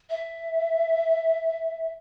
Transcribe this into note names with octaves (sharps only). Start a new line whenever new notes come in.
E5